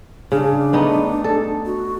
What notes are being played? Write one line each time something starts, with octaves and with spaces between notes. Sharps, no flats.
C#3 D4
A3 B3 D#4
A4
F#4